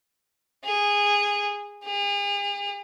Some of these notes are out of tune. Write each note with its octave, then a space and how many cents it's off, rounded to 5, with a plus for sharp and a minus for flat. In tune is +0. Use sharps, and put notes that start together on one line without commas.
G#4 -15
G#4 -45